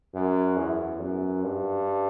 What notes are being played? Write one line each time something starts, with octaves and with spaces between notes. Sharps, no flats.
F#2
E2
F#2
G2